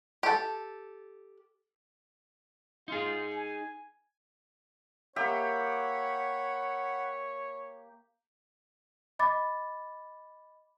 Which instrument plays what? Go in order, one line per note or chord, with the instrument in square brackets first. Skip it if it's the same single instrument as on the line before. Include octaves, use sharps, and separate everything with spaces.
[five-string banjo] G4 A4
[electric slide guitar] D#4 G#4 [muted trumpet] F4
[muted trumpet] G#5
[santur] A#3 E5 [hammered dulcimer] G4 [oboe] C#5 [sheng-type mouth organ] F#5 B5
[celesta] D#5 B5 D6 A6